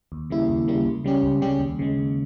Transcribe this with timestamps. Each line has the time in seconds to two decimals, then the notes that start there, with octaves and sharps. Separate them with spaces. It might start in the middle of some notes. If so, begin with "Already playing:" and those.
0.12 D#2
0.30 C#3 G3 A#3 E4
0.49 D#2
0.68 C#3 G3 A#3 E4
0.85 C#2
1.04 C#3 G3 C#4 G4
1.23 C#2
1.41 C#3 G3 C#4 G4
1.60 D#2
1.79 C#3 G#3
1.98 D#2